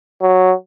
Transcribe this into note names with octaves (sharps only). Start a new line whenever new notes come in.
F#3